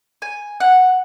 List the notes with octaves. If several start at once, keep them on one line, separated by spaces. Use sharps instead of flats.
G#5
F#5